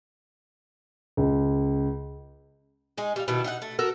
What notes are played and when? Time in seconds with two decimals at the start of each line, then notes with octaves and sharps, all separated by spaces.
1.17 C#2
2.98 G#3 D#4 G#4
3.16 G3 F4
3.28 B2 D#3 E4
3.44 D#4 F5 F#5
3.62 A3
3.79 F#4 A4 A#4